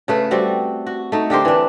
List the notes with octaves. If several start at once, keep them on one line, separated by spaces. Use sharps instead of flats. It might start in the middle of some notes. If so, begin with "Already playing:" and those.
C#3 A3 B4
G3 C4 F#4
F#4
A3 D#4
D3 G4 A#4 C5
E3 D4